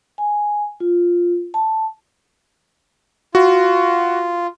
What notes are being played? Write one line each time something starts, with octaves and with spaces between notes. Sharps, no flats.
G#5
F4
A5
F4 F#4